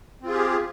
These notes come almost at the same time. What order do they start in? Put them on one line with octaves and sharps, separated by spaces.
C4 F4 G#4 G4